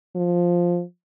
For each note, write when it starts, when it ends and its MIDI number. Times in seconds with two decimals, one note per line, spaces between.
0.16 0.82 53